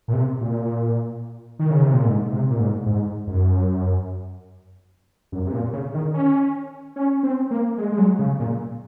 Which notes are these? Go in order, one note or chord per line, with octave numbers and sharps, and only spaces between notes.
A#2
C3
A#2
D#3
C#3
C3
A#2
G#2
C3
A#2
G#2
G#2
F#2
F#2
C3
A#2
C#3
D#3
C#4
C#4
C4
A#3
G#3
G#3
F#3
C#3
A#2